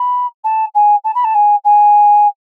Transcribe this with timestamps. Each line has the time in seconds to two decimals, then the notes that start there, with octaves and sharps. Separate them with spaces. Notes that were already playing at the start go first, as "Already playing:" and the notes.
Already playing: B5
0.44 A5
0.74 G#5
1.04 A5
1.15 B5
1.24 A5
1.34 G#5
1.64 G#5